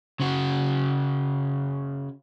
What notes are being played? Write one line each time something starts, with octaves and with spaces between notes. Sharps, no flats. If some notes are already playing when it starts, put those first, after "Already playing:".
C#3 F#4